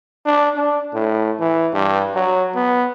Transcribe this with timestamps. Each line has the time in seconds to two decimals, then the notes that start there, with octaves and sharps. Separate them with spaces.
0.26 D4
0.56 D4
0.94 A2
1.39 E3
1.73 G2
2.14 F#3
2.55 B3